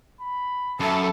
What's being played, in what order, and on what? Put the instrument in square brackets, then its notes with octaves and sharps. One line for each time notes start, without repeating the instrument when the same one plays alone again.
[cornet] B5
[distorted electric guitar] F#2 [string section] A4 [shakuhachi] E5 [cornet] B5